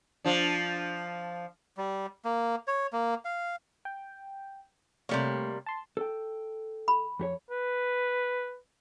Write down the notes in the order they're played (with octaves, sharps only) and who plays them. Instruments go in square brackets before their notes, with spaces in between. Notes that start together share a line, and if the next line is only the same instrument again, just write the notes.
[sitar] F3 D4
[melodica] G3
A#3
C#5
A#3
F5
[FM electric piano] G5
[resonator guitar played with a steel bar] C3 G3 A#3 [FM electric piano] A3 C#5
[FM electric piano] A5 C6
[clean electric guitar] A4 G5
[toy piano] B5
[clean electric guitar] F2 G4 C#5
[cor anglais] B4